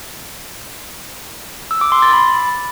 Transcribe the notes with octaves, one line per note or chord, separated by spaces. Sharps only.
E6
D6
C6
A6
B5